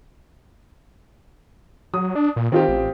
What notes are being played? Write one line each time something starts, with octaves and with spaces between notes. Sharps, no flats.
F#3 D#6
D4
A#2
D#3 C4 F4 G4
A1